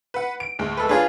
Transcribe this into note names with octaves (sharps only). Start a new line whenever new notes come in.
B4 F#5
D7
D2 G#3
A4 B4
D4 F4 G#4 B4 C#5